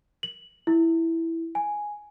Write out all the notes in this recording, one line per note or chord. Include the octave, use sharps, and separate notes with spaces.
F#7
E4
G#5